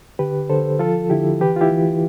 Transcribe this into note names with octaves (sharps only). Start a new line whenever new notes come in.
D3 G4 B4
D3 A4 C5
F3 F4 A4
D3 E4 G4
E3 G4 B4
F4
E4 G4
E3